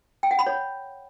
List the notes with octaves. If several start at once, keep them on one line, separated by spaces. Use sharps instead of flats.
G5
F#5
B5
C#5